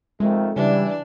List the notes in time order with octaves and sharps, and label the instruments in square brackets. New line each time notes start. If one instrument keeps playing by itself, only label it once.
[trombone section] F2 D#3 A3 [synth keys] G#3
[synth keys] C#3 [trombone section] E3 [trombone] G3 [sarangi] D4